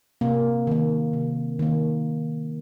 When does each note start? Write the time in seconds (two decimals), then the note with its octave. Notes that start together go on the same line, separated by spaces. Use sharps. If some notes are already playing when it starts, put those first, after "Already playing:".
0.21 C3 A#3
0.67 D#3 A#3
1.13 C3
1.59 D#3 A#3